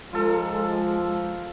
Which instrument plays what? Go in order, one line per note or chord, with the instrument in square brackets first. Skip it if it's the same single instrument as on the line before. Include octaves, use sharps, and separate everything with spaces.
[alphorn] F3 [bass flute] G#3 [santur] F4 A4 A#4